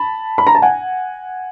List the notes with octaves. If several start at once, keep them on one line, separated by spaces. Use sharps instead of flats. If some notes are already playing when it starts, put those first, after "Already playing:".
Already playing: A5 B5
B5
A#5
A5
F#5 G#5